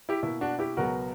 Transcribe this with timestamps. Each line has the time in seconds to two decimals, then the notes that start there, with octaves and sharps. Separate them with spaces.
0.09 E4 G4
0.23 B2 A#3 E4
0.41 D4 F#4
0.59 E4 G4
0.77 C#2 B2 F#3 B3 F#4 A#4